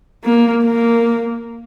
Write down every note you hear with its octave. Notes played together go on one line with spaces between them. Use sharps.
A#3
A#3